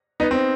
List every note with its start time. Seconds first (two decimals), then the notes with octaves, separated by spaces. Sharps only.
0.20 B3 D#4
0.31 C4